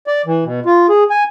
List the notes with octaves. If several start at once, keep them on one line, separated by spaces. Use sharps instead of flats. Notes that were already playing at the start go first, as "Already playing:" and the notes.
D5
E3
B2
F4
G#4
G#5